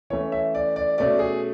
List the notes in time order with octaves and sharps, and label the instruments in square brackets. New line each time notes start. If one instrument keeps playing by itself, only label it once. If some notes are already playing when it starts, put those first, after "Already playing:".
[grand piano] E3 A3 C#4 C#5
E5
D5
D5
B2 A3 C#4 D5
G#4